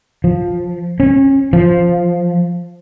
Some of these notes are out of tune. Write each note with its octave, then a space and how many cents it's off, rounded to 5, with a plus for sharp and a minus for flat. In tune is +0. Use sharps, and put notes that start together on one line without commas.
F3 +10
C#4 -30
F3 +0